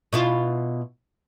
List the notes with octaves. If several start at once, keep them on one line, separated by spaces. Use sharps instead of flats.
B2 E4 F4